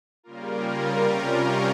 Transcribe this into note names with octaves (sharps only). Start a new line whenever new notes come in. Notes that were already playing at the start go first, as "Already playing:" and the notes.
C#3 G3 A#3 F4 A#4
C3 G3 C#4 F4 A#4